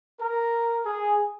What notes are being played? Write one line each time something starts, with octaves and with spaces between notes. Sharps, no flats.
A#4
G#4